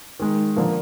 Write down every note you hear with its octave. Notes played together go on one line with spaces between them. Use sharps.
D#3 G#3
D3 F3 A#3